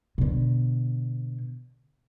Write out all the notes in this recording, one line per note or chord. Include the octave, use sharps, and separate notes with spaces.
B2 D3